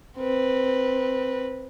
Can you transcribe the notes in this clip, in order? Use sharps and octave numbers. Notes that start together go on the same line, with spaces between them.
C4 B4